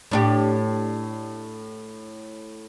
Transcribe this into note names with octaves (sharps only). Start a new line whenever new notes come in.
A2 D4 G4